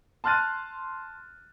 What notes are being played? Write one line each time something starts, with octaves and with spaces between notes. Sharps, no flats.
A5 C6 F6 F#6 A6 D#7